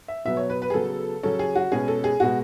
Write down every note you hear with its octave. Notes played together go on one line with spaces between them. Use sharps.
E5
B2 F#3 B3 E5
C#5
B4
B4
G#4
C#3 F#3 B3 A4
C#3 F#3 C#4 A4
G#4
F#4
B2 G#3 C#4 G#4
A4
G#4
B2 G#3 F#4